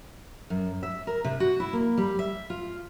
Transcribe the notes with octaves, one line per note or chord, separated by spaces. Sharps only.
F#2
E5
A#4
C3
F#4
E4
A#3
G3
E5
F4